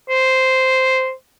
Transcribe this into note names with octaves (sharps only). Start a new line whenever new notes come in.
C5